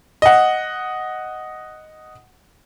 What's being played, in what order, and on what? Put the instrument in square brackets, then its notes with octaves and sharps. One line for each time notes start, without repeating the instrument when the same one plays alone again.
[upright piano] D#5 F#5